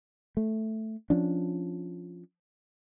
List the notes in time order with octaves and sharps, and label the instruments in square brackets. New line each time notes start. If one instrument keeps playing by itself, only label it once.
[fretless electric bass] A3
F3 C#4 D4